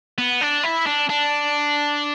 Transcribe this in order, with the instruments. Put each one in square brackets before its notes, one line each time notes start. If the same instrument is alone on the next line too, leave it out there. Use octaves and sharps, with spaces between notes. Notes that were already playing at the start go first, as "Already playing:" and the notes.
[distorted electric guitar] B3
D4
E4
D4
D4